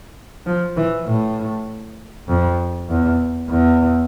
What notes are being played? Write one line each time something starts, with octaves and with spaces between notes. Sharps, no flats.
F3
E3
A2
F2
E2
E2